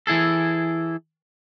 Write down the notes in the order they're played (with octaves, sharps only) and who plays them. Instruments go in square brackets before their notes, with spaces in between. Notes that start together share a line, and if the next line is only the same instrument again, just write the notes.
[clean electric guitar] E3 E4 G#4 A4